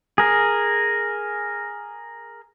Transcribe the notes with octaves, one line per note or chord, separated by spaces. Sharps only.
G#4 A#4